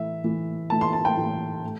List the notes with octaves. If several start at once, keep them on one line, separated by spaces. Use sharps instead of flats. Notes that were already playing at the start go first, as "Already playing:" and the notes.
Already playing: A2 E3 E5
A2 E3
A2 E3 A5
C6
A5
G5
A2 E3
A2